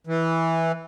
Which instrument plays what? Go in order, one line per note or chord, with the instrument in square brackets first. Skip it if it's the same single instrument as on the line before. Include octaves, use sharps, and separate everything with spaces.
[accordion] E3